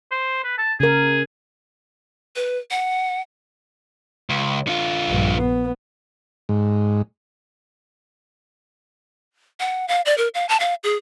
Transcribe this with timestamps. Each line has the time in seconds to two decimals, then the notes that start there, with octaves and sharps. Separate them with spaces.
0.11 C5
0.44 B4
0.58 A5
0.80 C#3 G#4 A#4
2.36 B4
2.71 F#5
4.30 C#2
4.67 D3 F4
5.08 A#1 G2
5.38 B3
6.49 G#2
9.60 F#5
9.88 F5
10.05 D5
10.18 A#4
10.34 F5
10.49 A5
10.60 F5
10.84 G#4